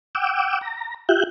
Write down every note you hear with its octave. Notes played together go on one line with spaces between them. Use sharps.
F#5 G5 D6 E6
A#5
F4 G4 E5 F#6 G6